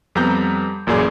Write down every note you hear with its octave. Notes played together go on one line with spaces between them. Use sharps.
F2 G3 B3 A#5 G6
A1 F#2 A#2 G#4 D5